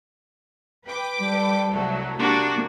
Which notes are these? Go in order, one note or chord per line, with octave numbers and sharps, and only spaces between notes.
B4 G5 D6
G3 A4
C2 F#3 A3
C3 A#3 D4 F#4